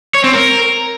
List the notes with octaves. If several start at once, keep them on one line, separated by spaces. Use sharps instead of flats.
C#5
C4
A#4